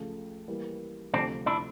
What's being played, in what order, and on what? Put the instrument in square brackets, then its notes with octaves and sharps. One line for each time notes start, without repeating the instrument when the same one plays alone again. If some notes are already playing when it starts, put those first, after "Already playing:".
Already playing: [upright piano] C#2 C#3 F3 A3
E3 G3 A#3
[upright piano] D2 C3 F3 A3 [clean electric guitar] C4 D4
[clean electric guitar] D4 E4